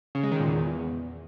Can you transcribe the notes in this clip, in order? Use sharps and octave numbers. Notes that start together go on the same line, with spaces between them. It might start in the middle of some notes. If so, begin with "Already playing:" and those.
C#3
G#3
D#3
A#2
E2